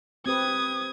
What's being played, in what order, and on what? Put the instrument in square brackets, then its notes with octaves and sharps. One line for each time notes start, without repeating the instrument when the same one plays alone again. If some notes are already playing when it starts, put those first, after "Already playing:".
[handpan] C4 G4 B4 [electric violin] D#6 G#6